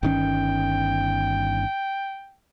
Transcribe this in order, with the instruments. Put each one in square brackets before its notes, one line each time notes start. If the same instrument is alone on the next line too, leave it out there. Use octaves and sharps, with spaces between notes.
[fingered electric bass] G1 D#3 C#4 [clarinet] G5